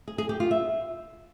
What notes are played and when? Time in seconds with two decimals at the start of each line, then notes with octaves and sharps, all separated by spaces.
0.08 G#4
0.18 G#4
0.29 G4
0.40 F4
0.51 E5